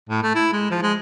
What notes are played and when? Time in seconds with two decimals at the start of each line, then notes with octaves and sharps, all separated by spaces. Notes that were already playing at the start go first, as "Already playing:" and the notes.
0.09 A2
0.22 A3
0.35 E4
0.52 G#3
0.70 F3
0.82 G#3